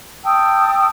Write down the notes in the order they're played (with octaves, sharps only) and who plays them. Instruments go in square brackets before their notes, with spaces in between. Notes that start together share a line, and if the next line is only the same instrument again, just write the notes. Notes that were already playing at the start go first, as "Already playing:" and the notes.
[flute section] G5 A5 D#6 E6